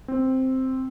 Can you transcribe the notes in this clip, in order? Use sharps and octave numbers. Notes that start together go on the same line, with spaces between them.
C4